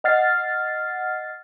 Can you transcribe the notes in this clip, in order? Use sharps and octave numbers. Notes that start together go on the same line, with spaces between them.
D#5 F#5 F6 A6 C7